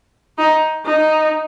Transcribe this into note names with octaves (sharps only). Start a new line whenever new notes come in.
D#4
D#4